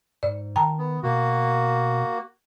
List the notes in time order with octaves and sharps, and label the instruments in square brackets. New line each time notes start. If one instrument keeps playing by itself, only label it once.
[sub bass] G#2 [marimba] D5
[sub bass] D#3 [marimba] G5 A5 A#5
[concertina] B3
[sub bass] B2 [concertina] A#3 F#4